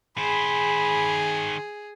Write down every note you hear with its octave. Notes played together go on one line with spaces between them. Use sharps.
D#3 G#4 C5 B5